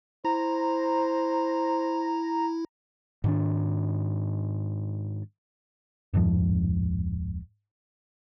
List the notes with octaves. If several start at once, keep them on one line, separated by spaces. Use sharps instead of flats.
E4 C5 A#5
G#2 D#3 D4
D1 F2 G#2 F3